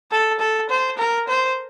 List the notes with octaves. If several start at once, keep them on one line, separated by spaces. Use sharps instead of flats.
A4
A4
C5
A#4
C5